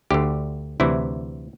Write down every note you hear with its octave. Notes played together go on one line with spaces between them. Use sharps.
D2 D3 G4
D2 C3 E3 E4